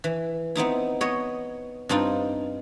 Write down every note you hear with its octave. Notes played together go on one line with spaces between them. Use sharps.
E3
B3 C4 D#4 E4
B3 C#5 D#5
G2 C4 D#4 F4